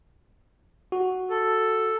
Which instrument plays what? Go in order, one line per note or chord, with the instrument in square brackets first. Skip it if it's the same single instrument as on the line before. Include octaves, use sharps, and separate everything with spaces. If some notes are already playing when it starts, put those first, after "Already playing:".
[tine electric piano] F#4
[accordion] A4